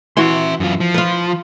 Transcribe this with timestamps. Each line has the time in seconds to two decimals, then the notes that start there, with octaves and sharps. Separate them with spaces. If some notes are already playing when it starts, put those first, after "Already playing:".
0.17 E3 F#4 E5 C6
0.60 F#2 F4
0.80 F3
0.94 F4 B4